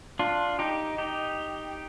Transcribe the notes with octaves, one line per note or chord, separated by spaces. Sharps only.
D4 F4
D#4 G4
D#4 G4